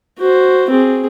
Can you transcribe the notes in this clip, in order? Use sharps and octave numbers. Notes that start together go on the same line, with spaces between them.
F#4 C5
C4 G#4